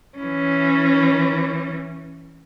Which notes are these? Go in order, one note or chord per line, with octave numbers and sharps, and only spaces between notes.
E3 C#4